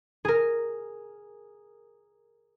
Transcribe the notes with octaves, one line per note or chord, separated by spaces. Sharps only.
G#4 A#4